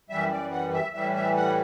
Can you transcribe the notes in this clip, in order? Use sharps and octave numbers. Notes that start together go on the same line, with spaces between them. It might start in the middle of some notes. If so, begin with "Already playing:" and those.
F#2 E3 G3 E5
D5
F#5
E5
A2 E3 G3 E5
E5
F#5